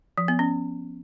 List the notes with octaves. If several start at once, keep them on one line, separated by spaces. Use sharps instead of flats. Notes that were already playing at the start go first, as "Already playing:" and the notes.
F3
B3
C#4